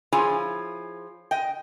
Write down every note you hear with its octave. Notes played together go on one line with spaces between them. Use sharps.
F3 E4 F4 G#4 C#5 G#5
D#5 G5